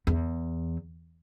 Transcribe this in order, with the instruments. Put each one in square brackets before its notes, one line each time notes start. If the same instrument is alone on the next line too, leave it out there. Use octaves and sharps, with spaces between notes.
[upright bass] E2